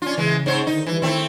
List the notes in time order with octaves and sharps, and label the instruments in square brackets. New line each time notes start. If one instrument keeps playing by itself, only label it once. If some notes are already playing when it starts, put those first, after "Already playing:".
[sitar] C#4 F4 [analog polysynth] D4
[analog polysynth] C#3 [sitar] E3 G#3
[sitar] G#2 C5 C#5
[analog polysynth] D3 D#3 [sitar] D#4
[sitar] E3 [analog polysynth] G3 B4
[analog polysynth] D#3 [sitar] A3 C4 E4